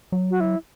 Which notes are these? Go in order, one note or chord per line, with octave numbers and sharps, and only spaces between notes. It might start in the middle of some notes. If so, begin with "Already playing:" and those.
F#3
F#4
E4